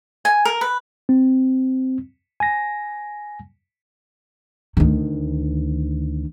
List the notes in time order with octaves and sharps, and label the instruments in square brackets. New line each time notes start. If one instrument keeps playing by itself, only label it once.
[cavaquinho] G#5
A#4
B4
[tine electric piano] C4
G#5 A#6
[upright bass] D2 D#3